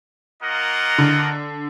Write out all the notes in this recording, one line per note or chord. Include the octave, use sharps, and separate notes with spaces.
A#3 F4 A#4 D#5 F#5
D3